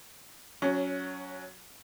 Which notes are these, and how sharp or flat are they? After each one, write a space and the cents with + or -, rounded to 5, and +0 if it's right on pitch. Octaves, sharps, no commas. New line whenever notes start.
F#3 -10 C#4 +15